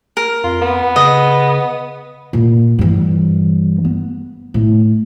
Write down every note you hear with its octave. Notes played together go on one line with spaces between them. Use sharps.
A#4
F2 F4
B3
C#3 D#5
A#2
G2 E3
B3
A2